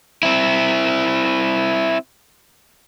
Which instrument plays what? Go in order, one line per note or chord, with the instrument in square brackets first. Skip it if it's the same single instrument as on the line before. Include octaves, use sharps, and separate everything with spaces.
[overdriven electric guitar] C4 E4